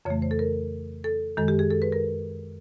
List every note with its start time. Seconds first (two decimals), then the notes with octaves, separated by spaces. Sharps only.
0.05 F2 C#3 E3 A3 C#5
0.22 C5
0.31 A4
0.39 A#4
1.04 A4
1.37 F#2 D#3 G#3 A4
1.48 G4
1.59 G#4
1.71 A4
1.82 B4
1.92 A#4